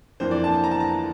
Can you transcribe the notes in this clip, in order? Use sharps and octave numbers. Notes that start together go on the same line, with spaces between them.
F2 E3 A#3 D4 C5
D5
A5
A#5
A5
A#5